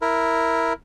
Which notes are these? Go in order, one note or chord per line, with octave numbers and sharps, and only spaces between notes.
E4 A#4